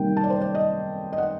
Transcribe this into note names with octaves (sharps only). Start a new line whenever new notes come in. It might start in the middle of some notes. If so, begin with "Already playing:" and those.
Already playing: C3 D#3 G3 A#3 G5
A5
D5
C5
D5
D#5
D#5
F#5